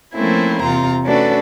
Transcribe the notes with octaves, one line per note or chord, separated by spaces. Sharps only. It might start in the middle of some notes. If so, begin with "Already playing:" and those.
F3 A3 A#3 C4 C#4 E4
E2 C3 F4 A#5
A3 C#4 D4 F#4 A4 B4